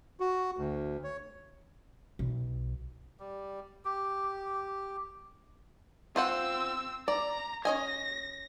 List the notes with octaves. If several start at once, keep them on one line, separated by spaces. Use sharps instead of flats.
F#4
D2
C#5
B1
G3
G4
C4 F4 C5 F#5 E6
D5 A#5
C#4 D#5 G#5 A#6